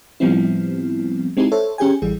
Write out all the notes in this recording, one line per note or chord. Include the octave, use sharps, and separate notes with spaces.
A2 F3 G3 B3 C4 E4
G#3 C4 D#4 E4 G4
A4 C5 C#5 E5
C#4 G4 G#4 G5 G#5
A1 E3 G3 G#4